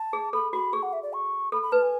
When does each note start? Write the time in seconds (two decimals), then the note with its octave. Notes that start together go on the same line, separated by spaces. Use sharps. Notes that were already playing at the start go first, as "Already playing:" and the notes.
Already playing: A5
0.13 G#4
0.33 A4 B5
0.52 F#4 B5
0.73 G#4 C#6
0.83 F#5
0.93 E5
1.03 D5
1.13 C#6
1.52 A4 B5
1.62 B5
1.72 B4 A5
1.82 G#5